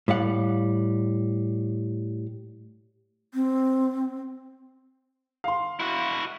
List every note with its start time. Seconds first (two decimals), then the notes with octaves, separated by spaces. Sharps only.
0.08 A2 G3 F5 F#5
3.34 C4
5.44 F5 C6
5.80 E4 F#4